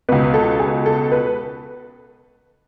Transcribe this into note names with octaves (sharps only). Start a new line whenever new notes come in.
C#2 B2 B4
A4
G#4
A4
B4